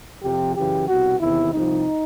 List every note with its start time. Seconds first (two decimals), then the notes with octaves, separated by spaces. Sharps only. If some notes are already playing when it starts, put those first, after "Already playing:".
0.22 F2 C3 F3 G4
0.55 F#2 C#3 E3 G4
0.88 C2 B2 F#4
1.20 E2 C3 D#3 E4
1.52 C2 C3 F3 D#4